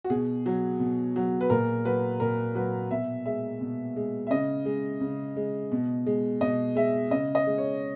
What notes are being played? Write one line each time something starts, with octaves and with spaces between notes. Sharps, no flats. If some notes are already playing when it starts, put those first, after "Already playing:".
F#4
B2 G#4
F#3
B2
F#3
B4
A#2 A#4
F#3 B4
A#2 A#4
F#3 B4
B2 E5
G#3 E5
B2
G#3
E5
C#3 D#5
G#3
C#3
G#3
B2
G#3
B2 D#5
G#3 E5
C#3 D#5
D#5
G#3
C#5